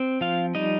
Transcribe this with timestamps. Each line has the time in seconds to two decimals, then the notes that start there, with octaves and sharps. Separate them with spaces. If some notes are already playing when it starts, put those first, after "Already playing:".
Already playing: C4
0.21 F3 F4 F5
0.55 G3 D#4 D#5